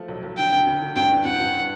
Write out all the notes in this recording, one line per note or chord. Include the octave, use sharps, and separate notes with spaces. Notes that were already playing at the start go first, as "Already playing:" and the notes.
Already playing: F3 A3
B1
B1
D3 G5
D2
D2
D3
G2 G5
E3
G2 F#5
G2